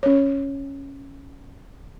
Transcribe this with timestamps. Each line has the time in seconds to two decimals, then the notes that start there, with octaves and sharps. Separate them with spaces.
0.03 C#4 C#5